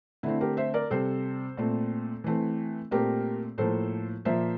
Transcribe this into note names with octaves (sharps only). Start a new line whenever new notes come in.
D3 A3 C4 E4
G4 A#4
C5 E5
A#4 D5
C3 G3 C4 A4 C5
A#2 A3 C4
E3 A3 C4
A#2 A3 C4 G4 A#4
A2 F3 A#3 A4 C5
A#2 F3 A#3 C5 E5